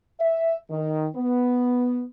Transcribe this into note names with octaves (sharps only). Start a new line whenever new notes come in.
E5
D#3
B3